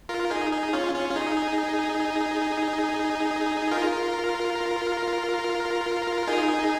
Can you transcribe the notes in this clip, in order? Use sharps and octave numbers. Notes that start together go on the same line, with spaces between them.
F4 A#4
D#4 G#4
D#4 G#4
C#4 F4
C#4 F4
F4
D#4 G#4
F4 A#4
D#4 G#4